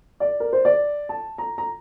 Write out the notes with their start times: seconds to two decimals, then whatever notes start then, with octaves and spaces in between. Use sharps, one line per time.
0.20 D5
0.40 A#4
0.53 C5
0.65 D5
1.09 A5
1.38 A#5
1.58 A#5